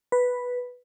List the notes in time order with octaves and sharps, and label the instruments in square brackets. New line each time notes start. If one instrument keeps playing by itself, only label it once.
[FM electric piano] B4